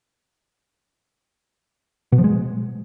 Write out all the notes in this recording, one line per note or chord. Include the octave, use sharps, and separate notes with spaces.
B2
F3
G#3